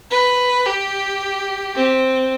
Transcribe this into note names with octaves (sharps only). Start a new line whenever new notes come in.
B4
G4
C4